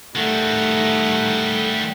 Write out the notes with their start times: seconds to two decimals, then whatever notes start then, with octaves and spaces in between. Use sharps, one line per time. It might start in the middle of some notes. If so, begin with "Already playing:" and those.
0.15 D#3 G3 A3 F#5